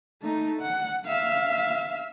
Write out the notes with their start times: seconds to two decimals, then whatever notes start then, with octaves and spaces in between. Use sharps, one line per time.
0.22 A3 D#4
0.62 F#5
1.06 E5 F5